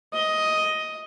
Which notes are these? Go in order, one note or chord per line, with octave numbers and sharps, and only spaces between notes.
D#5